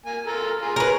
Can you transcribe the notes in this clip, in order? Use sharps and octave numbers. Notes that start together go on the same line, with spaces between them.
A#3 G#5
F4 A4 A#4
F4 G#4
G#4 A#4 B4 C#5